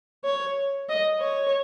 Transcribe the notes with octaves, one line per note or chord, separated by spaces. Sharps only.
C#5
D#5
C#5